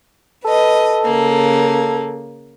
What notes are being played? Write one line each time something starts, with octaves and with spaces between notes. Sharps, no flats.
A4 B4 D#5
C#3 A#3